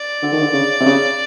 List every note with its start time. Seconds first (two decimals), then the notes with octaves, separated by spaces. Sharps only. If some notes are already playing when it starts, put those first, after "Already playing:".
Already playing: D5
0.22 D3
0.32 D#3
0.43 D3
0.53 C#3
0.80 C3
0.86 C#3